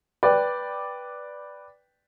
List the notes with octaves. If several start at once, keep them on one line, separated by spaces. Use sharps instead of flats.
B4 D5 G5